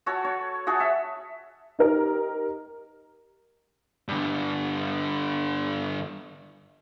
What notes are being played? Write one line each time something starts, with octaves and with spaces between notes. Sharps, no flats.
F#4 A4 C#5
C#5
F#4 G#4 A4 C#5
E5
D#4 G4 A#4
G2 D3